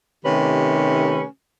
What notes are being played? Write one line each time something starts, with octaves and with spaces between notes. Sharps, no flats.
C3 D#3 A3 C#4 G4 B4